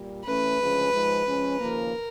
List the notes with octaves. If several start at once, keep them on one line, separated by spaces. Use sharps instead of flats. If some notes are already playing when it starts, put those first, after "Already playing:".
Already playing: A#2 G3
E3 A3 C#4 B4
D2 C#3 F3 G#3 C#4
G#2 F3 G#3
F3 G#3 C#4
D#2 C#3 F3 A#3 A#4